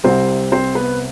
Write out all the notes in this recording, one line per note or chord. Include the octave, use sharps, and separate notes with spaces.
C2 C3 G3 C4 C5
C4 C5
B3 B4